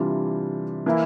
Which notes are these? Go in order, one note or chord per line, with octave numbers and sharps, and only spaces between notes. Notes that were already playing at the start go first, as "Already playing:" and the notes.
Already playing: C3 E3 G3 D4 F4
E3 A#3 E4